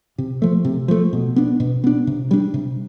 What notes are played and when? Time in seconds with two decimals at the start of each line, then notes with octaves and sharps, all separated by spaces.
0.18 C3
0.42 F3 A3
0.65 C3
0.88 F3 A3
1.13 B2
1.36 B3 D4
1.60 B2
1.84 B3 D4
2.07 C3
2.31 G3 D4
2.54 C3